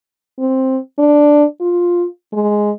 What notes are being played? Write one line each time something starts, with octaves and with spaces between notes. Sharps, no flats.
C4
D4
F4
G#3